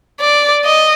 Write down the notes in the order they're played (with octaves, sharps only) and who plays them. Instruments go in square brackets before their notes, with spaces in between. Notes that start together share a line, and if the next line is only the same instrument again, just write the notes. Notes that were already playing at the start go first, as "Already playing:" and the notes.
[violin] D5
D#5